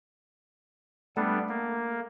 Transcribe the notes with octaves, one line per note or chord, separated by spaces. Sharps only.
G3 A3 B3 D4
A#3